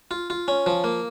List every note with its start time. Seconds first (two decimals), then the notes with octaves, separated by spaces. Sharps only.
0.11 F4
0.30 F4
0.48 C#4
0.66 F3
0.84 A#3